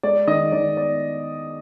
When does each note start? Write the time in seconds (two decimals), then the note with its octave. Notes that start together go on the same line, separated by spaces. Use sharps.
0.03 G#3 D5
0.28 D#3 D#5
0.52 D#3 D5
0.77 B3 D5